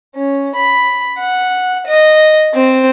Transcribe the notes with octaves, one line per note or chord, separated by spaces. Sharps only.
C#4
B5
F#5
D#5
C4